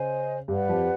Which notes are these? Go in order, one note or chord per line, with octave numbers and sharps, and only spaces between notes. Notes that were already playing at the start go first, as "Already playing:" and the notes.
Already playing: C#3 C#4 C5 D#5 G#5
G2 G3 G4 B4 D5 F#5
F2 F3